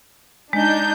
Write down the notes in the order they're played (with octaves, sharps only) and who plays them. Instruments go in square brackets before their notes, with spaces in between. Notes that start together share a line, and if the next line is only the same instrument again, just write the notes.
[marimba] G#3 [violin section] D4 D#4 G6